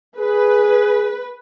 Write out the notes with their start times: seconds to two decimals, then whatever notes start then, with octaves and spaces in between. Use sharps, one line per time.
0.18 G#4 B4